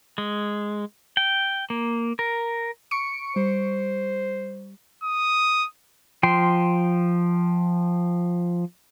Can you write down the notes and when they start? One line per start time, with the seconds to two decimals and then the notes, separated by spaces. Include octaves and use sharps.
0.18 G#3
1.17 G5
1.70 A#3
2.19 A#4
2.91 C#6 C#7 D7
3.36 G3 C5
5.03 D#6
6.23 F3 G5 C6